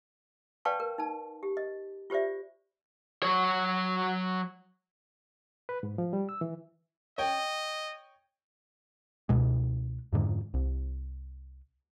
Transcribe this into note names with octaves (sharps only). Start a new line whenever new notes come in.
B4 D5 F5 G5 A5 C#6
A#4
D#4 A5
G4
D#5
F4 G4 C5 D5 E5
F#3 C#5
B4
G#2
F3
G3
E6
E3
C#5 D#5 G5
C#2 B2 G#3
F2 G#2 D3
C2